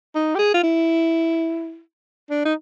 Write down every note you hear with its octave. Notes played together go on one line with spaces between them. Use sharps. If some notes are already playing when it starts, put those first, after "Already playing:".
D#4
G4
G#4
F4
E4
D4
D#4